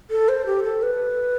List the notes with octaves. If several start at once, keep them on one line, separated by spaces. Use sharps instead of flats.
A4
C5
G4
A4
B4